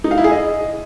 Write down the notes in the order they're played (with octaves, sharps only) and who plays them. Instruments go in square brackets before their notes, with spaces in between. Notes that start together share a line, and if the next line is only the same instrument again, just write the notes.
[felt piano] D#4
F5
E4
G#4
D#5